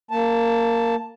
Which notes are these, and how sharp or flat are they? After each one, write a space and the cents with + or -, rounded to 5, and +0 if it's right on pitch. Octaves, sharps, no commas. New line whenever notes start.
A#3 -10 A5 +0